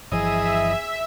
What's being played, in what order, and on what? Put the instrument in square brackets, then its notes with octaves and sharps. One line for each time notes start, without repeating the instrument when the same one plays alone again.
[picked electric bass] G1 E3 F3 [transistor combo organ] E4 D#5 [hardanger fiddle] G#4 [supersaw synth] E5